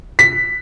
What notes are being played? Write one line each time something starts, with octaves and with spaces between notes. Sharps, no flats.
B6